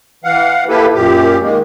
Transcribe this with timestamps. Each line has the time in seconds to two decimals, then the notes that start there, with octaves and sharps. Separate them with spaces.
0.24 E3 F5 F#5
0.69 A#3 E4 G4 A4 B4
0.94 F#2 A#2 G4
1.42 D#3 G#3 A#3